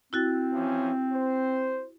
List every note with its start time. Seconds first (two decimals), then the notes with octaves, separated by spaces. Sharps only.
0.13 C4 E4 F#4 A6
0.52 E3 F3 C#4
1.13 C5